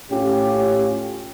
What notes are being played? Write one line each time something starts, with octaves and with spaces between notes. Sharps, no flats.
A2 C#4 F4 G4